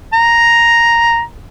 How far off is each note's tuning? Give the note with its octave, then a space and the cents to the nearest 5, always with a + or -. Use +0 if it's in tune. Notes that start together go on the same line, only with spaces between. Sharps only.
A#5 +0